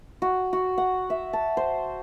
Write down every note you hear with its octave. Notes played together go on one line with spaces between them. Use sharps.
F#4
F#4
F#5
E5
A5
C5